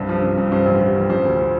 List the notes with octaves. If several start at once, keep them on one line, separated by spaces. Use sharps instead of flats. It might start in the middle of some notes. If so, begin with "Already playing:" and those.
Already playing: C2 G2 C5
F3
G2
G2
G2 C5
A1
F3
A1
F3 C5
D2